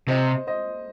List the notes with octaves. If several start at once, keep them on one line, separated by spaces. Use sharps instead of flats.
C3 C5 D#5
C5 D#5